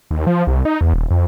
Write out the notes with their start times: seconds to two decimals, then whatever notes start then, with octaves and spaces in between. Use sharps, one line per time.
0.11 D#2
0.27 F3
0.47 C2
0.65 D#4
0.81 E2
0.94 D#1
1.10 F2